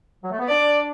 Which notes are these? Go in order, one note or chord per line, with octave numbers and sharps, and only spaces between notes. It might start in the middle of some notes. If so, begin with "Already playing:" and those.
F#3
A3
B3
D4 D5